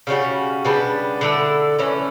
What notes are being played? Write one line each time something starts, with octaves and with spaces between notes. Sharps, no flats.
C#3 G3 C#4 F#4
C#3 G3 B3 D4
D3 A3 E4 A4
E3 A3 C#4